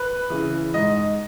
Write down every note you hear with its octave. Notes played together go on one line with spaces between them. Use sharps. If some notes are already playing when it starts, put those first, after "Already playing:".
Already playing: B4
C#3 E3
G#2 D#5